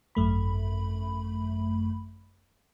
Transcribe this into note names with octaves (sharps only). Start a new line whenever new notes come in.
G#1 F#2 A3 B5